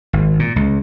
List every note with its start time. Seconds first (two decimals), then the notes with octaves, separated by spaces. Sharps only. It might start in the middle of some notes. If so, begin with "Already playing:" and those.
0.13 G#1
0.39 A#2
0.56 C#2